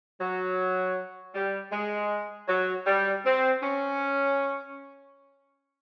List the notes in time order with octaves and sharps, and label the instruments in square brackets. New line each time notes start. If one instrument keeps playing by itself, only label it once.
[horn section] F#3
G3
G#3
F#3
G3
C4
C#4